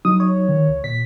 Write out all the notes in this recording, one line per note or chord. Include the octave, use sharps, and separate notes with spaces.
F#3 D#4 D#6
C#5
D#3
C#2
A#2 B6